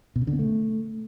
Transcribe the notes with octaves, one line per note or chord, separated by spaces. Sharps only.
B2
C#3
D3
B3
A3